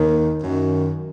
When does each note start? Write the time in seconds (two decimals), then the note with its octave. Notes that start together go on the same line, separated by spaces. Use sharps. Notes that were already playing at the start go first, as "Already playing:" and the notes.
Already playing: D#2 D#3
0.43 F#2 D#3